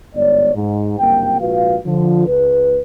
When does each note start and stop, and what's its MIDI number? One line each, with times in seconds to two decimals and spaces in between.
0.16 0.55 31
0.16 0.55 44
0.16 0.55 59
0.16 0.55 73
0.16 0.55 74
0.55 0.94 44
0.99 1.39 30
0.99 1.39 43
0.99 1.39 48
0.99 1.39 58
0.99 1.39 79
1.40 1.77 34
1.40 1.77 44
1.40 1.77 65
1.40 1.77 66
1.40 1.77 71
1.40 1.77 77
1.86 2.27 50
1.86 2.27 53
2.27 2.81 37
2.27 2.81 71